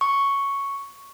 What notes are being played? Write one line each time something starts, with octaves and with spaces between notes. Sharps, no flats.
C#6